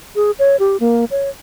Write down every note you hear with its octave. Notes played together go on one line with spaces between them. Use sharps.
G#4
C#5
G4
A#3
C#5